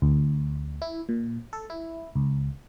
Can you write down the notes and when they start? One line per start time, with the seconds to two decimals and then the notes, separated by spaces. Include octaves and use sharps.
0.02 D2
0.82 E4
1.09 A#2
1.53 A4
1.70 E4
2.16 C#2